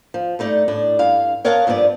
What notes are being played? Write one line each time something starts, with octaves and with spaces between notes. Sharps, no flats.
F3
G2 A3 D#4 D5
A2 D4
G2 F5
A#4 C#5 D#5 F5 F#5 A5
G2 F3 B3 A#4 D5